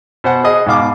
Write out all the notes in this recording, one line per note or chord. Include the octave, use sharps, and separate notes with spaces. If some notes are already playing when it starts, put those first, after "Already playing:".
B2 C5 F#5
G#4 D#5
G#2 B2 F5 D6